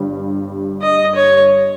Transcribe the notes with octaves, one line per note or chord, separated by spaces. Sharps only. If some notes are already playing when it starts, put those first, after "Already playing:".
Already playing: G1 G2 G3
D#5
C#5